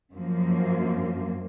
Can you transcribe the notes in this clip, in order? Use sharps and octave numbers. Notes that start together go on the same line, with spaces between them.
F#2 F3 A#3